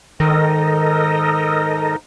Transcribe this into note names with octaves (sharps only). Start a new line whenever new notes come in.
G#2 D#3 D#4 A4 A#4 D#5